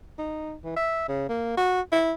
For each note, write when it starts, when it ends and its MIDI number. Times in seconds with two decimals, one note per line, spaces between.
0.19 0.54 63
0.64 0.75 52
0.76 1.07 76
1.09 1.27 49
1.29 1.55 58
1.57 1.81 66
1.92 2.13 64